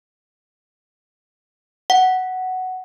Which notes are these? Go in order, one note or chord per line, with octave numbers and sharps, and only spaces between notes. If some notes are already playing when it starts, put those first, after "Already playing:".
F#5